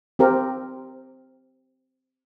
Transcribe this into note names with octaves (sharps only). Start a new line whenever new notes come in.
C4 G4 A#4